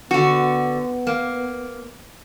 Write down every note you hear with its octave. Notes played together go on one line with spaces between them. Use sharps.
D3 B3 F#4
A#3